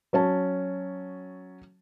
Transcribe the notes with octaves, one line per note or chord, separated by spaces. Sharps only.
F#3 C#4 A5